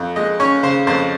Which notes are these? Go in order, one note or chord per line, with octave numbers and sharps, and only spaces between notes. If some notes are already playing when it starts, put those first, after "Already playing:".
Already playing: F2
G#3 D#5
C#4 C#5
C#3 C5
F2 C5